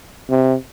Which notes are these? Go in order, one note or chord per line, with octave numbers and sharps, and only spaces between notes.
C3